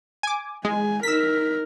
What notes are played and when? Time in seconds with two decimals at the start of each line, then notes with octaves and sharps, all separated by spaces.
0.23 G#5 D6
0.65 G#3 G#5
1.03 D#4 A#4 E6 B6